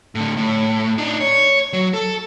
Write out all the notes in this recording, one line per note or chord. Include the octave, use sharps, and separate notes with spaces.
A2 D3
A2
D4 D#4
C#5
F#3
A4